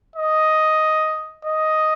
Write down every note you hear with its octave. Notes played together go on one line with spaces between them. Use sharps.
D#5
D#5